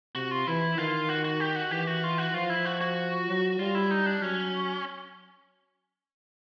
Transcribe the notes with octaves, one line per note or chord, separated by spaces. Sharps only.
C3 F#4
F4
E3 E4
D#3 F4
F#4
F#4
G4
F#4
E3 G4
F#4
F4
F#4
F3 F4
E4
F#4
F#4
F#3
G3 F4
E4
D#4
D4
F#3 C#4